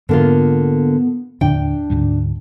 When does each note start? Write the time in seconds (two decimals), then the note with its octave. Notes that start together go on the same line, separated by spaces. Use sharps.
0.09 G#2 D3 A#3 B3 F4
1.41 D#2 A2 D3 D4 G5
1.90 D2 G#2 G3